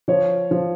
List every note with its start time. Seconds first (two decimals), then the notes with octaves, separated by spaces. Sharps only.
0.08 F3 C#5
0.51 F3